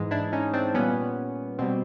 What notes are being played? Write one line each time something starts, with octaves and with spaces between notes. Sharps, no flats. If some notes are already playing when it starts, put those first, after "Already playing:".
Already playing: G#2 E3 G#3
D4 E4
C#4 D#4
C4 D4
A#2 G3 B3 C#4
B2 G3 C4